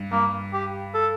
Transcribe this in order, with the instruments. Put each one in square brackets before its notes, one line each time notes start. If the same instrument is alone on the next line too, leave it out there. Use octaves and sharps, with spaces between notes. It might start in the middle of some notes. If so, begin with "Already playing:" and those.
Already playing: [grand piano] G2
[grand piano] G2 [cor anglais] A#3
[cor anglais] G4
A4